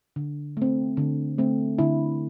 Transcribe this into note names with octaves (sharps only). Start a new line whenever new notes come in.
D3
A3 C4
D3
A3 C4
D3 E4